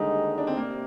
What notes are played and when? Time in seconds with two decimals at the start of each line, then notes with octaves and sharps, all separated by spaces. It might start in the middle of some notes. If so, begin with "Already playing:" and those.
Already playing: D#2 D3 G3 G#3 D#4
0.38 D4
0.47 C4
0.56 C3 A#3